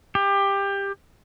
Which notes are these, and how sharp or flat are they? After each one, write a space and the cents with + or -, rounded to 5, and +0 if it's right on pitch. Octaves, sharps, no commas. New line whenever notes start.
G4 +20